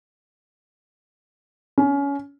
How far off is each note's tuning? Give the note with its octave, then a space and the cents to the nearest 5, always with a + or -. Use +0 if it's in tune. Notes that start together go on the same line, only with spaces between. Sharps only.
C#4 +25